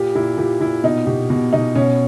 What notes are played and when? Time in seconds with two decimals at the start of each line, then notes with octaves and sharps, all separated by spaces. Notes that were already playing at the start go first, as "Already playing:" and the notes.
Already playing: A#2 G4
0.15 A#2 E4
0.38 A#2 G4
0.60 A#2 E4
0.84 B2 D#4
1.07 B2 G4
1.30 B2
1.53 B2 D#4
1.76 B2 C#4